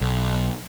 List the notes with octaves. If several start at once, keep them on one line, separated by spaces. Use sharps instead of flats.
B1